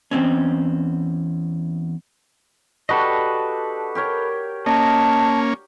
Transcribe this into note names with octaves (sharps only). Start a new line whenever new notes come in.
E2 G#2 C4 C#4
D4 F#4 G4 A4 B4 D#5
G4 A#4 C#5
A#3 C#4 D#5 A5